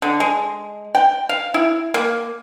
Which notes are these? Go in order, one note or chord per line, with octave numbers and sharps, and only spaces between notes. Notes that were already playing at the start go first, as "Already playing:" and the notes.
D3
G#3
G5
F5
E4
A#3